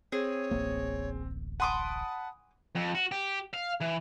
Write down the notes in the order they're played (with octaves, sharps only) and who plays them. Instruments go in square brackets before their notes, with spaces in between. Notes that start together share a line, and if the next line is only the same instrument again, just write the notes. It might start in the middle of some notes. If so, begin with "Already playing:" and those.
[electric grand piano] C4 [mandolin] G#4 [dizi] C#5
[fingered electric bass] D1 A1 A#3
[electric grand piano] F#5 B5 D#6 [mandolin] G#5 C6 D6 [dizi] A5
[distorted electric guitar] F2
F#4
G4
F5
E3